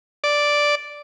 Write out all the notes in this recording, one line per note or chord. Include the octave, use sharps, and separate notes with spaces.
D5